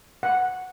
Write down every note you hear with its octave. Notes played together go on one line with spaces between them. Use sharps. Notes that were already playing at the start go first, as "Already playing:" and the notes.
F#5